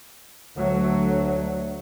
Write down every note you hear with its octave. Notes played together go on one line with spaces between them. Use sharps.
D2 F#3 A3